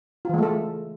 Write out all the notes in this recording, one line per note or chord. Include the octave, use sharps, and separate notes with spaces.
E3 G#3 A3 F4 A4